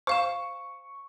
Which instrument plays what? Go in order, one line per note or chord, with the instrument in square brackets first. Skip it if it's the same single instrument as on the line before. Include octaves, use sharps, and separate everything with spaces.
[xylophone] C5 F5 E7 [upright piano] C#6